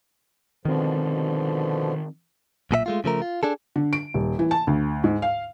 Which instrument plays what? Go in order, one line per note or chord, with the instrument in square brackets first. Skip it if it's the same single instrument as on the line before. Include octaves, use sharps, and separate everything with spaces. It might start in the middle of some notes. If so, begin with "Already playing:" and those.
[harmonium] B2 D3 F3 [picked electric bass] D#3 C4
[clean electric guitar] B1 A#2 G#4 E5
G#3 A3 F4
C#3 F3 A3 A#4
F4
D4 G#4 A4
[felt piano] D3
D7
D#1
E3
A5
D2
G#2
F5